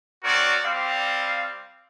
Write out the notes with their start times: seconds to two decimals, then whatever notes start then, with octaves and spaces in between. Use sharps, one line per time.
0.24 C4 F#4 A#4 C#5 D5
0.64 G3 C4 F5